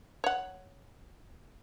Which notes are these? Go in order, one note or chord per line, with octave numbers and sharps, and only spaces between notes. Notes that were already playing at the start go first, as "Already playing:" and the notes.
C#5 F#5